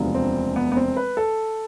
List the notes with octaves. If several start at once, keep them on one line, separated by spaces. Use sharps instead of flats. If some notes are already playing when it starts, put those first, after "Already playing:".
Already playing: E1 D2 C3 F3 B3
C4
B3
B3
C4
B4
A4